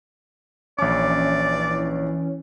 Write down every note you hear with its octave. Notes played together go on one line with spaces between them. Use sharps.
A#1 E3 C#4 C#5 D5 D6